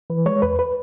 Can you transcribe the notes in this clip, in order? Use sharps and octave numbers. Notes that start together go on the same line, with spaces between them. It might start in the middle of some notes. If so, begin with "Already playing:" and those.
E3 B4
G#3 C#5
E2 B4
B4